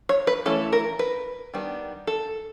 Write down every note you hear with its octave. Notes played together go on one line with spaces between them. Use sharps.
C#5
B4
E3 A3 C#4 E4 A4
A#4
B4
D#3 G3 B3 D4
A4